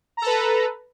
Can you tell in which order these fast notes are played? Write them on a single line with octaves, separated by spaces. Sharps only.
A#5 A4 B4